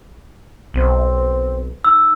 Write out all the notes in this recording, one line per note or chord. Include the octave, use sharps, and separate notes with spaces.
B1 C4
D#4 E6